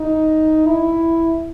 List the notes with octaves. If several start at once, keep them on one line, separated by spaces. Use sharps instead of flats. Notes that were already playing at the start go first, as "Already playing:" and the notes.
Already playing: D#4
E4